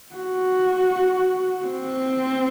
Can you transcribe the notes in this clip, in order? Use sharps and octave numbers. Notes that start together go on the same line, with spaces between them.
F#4
C4